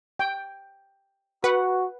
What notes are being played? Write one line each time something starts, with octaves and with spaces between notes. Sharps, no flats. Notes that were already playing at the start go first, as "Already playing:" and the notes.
G5
F#4 B4 F#5